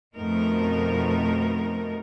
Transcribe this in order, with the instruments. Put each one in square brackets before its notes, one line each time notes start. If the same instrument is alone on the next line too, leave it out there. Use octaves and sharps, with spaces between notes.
[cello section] F2 B2 A3 D#4 A#4